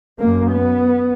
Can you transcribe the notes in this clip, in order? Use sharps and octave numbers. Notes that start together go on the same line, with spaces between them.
F#2 A#3
B3